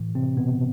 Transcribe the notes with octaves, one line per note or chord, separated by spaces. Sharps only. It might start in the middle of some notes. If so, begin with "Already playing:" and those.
Already playing: A2 E3
C3 C4
B2 B3